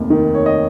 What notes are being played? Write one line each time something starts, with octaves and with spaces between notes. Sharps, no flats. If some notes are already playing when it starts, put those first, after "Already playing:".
Already playing: F1 D#2 A#3
D#3
C#5
D#5